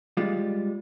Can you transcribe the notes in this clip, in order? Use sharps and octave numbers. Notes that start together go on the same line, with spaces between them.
G3 G#3 F4